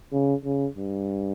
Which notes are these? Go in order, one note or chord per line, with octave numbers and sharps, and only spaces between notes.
C#3
C#3
G2